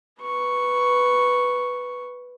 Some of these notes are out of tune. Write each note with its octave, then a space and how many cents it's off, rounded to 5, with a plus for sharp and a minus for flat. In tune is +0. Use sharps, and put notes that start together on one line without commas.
B4 +0 C#6 +0